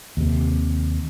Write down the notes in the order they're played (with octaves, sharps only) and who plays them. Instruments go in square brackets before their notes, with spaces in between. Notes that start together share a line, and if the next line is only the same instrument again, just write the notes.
[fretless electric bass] D#2 C3